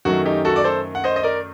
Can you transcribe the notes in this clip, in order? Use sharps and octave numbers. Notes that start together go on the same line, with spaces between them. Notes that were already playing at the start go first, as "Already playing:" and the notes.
F#2 D#3 F#3 A3 F#4
D#4 G4
F#4 A4
D5
A4 C5
F#5
C5 D#5
D#5
A#4 D5